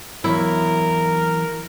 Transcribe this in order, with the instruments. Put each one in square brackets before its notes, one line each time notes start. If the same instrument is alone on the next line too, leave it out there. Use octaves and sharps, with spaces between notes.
[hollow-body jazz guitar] E2 F#3 [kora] E4 [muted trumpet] A#4